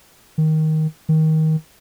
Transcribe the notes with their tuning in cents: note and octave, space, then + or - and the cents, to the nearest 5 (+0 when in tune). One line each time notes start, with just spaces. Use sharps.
D#3 +10
D#3 +20